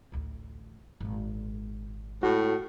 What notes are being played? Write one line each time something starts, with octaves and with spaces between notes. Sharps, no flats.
A1 D2
G#1 A#2
A2 G#3 F#4